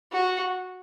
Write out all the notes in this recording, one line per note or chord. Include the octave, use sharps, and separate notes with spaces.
F#4